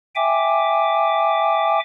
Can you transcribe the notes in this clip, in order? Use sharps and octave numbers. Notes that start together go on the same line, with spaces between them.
E5 G5 G#5 D6